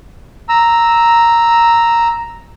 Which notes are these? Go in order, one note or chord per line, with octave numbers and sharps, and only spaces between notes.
A#5 E6